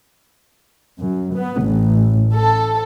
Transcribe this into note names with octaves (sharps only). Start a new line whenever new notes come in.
F#2
B3
A1
A4